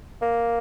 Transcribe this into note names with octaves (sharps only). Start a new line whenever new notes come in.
A#3